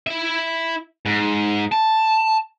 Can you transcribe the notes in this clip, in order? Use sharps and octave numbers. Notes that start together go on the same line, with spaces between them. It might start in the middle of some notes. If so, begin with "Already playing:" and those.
E4 E5
G#2
A5